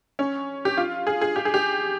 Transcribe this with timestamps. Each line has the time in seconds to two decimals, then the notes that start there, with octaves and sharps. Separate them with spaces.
0.19 C#4
0.65 G4
0.77 F4
1.07 G#4
1.21 G#4
1.36 G4
1.45 G#4
1.54 G4